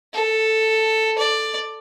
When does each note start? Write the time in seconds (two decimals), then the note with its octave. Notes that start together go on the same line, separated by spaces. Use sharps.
0.13 A4
1.18 D5